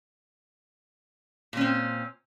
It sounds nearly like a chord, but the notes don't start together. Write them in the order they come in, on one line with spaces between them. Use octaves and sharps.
A#2 C#4 C4